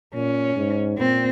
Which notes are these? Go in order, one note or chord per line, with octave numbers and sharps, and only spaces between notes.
A#2 C#4
G#2
A#2 C4